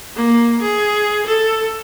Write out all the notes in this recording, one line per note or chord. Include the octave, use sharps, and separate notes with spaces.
A#3
G#4
A4